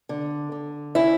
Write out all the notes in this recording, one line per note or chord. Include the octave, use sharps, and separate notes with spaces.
D3
D3
C#4 E4